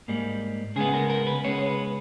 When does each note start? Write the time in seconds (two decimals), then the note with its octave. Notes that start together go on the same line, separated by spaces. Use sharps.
0.08 G#2 G3 A#3
0.76 C#3 G#3 B3 G#4
0.94 A#4
1.10 A#4
1.27 B4
1.44 C#3 G#3 B3 C#5
1.66 B4